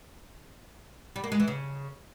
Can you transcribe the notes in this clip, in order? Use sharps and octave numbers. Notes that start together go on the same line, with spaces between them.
G3
A#3
G#3
E3
C#3